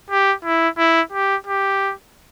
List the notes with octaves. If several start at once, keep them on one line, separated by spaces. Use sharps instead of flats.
G4
E4
E4
G4
G4